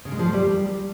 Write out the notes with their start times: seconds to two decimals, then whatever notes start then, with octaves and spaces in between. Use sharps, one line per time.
0.05 C#3
0.12 G#3
0.19 F3
0.26 A3
0.33 G3